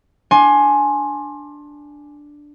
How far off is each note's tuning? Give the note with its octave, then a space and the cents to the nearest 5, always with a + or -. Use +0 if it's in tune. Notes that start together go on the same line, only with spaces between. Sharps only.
D4 +0 G#5 +10 C6 +25